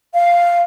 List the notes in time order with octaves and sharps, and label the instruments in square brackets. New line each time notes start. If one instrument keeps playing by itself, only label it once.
[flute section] F5